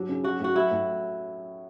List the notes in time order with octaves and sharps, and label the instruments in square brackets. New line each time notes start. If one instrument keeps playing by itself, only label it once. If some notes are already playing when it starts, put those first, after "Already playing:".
Already playing: [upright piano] F#3 [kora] D4
[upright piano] C#3
[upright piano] F#3 [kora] F#4
[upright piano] A2 [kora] F#4
[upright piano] F#3 [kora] E4
[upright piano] A2